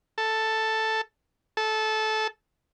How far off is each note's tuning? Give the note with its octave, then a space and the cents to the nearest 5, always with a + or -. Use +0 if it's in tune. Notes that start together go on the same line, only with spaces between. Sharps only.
A4 +5
A4 -15